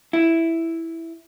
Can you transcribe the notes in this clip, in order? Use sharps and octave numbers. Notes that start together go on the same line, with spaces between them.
E4